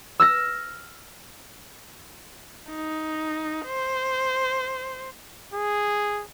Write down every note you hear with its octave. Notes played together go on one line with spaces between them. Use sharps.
E6 F6 A#6
D#4
C5
G#4